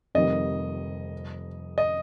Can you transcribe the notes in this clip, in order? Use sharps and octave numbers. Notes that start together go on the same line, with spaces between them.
F1 F2 D#3 G3 D#5
D#5